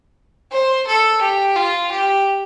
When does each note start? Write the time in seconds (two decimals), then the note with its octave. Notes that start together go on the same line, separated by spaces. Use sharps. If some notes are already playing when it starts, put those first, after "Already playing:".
0.51 C5
0.87 A4
1.21 G4
1.56 F4
1.92 G4